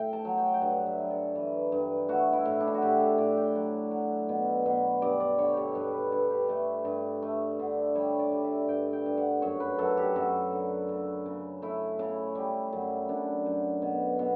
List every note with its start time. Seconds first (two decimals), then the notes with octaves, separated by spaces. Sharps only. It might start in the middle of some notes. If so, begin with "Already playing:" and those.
Already playing: A2 E5 G5
0.13 A5
0.25 F#3
0.38 G5
0.54 G5
0.61 G2 F#5
0.86 E5
0.99 G3
1.11 A4
1.35 E3
1.72 G2
2.09 A3 F#4
2.33 E4
2.45 A2
2.60 D4
2.67 E4
2.74 F#4
2.82 A2 G4
3.00 A4
3.18 A2 D5
3.37 G5
3.55 F#3 F#5
3.91 F#3
4.29 B2
4.66 B2
5.02 G2 D5
5.20 D5
5.39 D3 C#5
5.53 G4 A4
5.75 G2 B4
5.94 B4
6.12 G2 A4
6.30 G4
6.49 A3 A4
6.85 G2
7.22 A3
7.59 D3
7.95 G3 C#5
8.19 D5
8.31 G3
8.44 E5
8.68 G2 G5
8.93 G5
9.06 G2
9.18 F#5
9.42 F#2 C#5
9.60 B4
9.79 F#2 A4
9.97 G4
10.16 F#2 F#4
10.53 D3
10.89 C#3
11.26 C#3
11.62 A3 E4
11.99 C#3
12.35 G3
12.73 F#2
13.09 F#2 D4
13.46 F#2
13.82 B2
14.19 B2